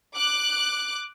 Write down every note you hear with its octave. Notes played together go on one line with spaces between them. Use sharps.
D6 F#6